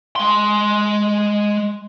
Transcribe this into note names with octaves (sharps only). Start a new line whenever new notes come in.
G#3 C6